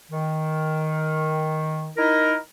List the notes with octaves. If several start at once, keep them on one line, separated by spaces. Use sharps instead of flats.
D#3
D#4 E4 A#4